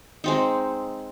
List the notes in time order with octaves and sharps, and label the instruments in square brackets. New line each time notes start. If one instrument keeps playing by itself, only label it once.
[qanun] G#3 C4 D#4